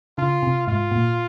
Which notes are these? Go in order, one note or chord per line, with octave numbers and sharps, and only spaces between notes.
C#3 F4
C3
G#2 F4
A#2